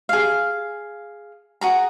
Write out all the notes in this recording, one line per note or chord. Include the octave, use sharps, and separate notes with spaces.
G#4 F5
F#4 G#4 A#5